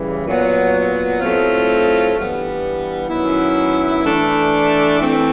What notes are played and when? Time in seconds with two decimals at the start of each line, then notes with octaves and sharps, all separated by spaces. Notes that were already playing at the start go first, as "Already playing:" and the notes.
Already playing: C#3 E3 G3
0.26 A#2 F#3 B3
1.21 A2 F#3 A3 C4 F4
2.16 G2 E3 G3 B3
3.09 F#2 D#3 F#3 B3 E4
4.03 E3 A3 D4
4.99 E3 A3 C4